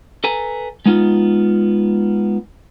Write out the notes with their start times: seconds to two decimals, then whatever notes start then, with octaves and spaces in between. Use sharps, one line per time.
0.24 A4 B4 G#5 A#5
0.86 G#3 B3 D#4 F4